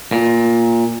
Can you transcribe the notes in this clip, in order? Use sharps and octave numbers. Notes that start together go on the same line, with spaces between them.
A#2